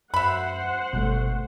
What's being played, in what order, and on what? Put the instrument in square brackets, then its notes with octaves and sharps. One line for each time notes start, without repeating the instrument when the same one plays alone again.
[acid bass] F#2 [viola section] C5 F#5 [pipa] E5 B5
[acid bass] G1 [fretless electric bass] B2 G3 A3